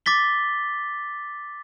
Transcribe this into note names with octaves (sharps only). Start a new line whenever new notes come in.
D6 A6 B6 G7